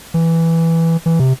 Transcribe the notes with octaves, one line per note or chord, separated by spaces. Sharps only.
E3
E3
C3